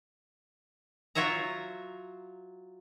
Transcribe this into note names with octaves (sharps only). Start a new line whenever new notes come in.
F#3 F4 C#5 E5 A#5